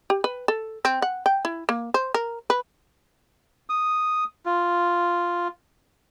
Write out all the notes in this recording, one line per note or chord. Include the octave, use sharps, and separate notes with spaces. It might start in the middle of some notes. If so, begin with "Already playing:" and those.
G4
B4
A4
C4
F#5
G5
E4
A#3
C5
A#4
B4
D#6
F4